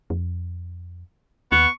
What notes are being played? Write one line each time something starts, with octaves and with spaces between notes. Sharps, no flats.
F2
D#2 B3 C#6